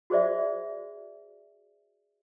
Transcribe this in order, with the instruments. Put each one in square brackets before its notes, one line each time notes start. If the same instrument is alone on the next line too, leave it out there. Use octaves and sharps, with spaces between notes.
[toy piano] F#4 G#4 C5 D5 E5